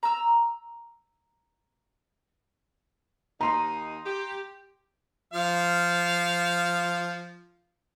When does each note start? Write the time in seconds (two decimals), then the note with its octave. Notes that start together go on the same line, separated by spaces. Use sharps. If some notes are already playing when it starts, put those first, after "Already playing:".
0.03 A#5 E6
3.41 D#2 D#4 A#5 C6
4.06 G4
5.33 F3 F5